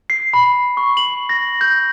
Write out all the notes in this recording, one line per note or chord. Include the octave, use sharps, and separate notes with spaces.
C7
B5
C#6
F#7
A#6
G6